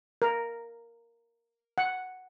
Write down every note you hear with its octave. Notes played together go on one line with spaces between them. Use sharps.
A#4
F#5